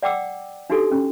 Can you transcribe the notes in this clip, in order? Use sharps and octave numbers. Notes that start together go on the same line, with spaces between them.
D5 F#5 G5 D6 E6
D4 D#4 F#4 G4 A4
C#4